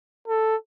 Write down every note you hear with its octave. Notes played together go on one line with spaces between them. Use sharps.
A4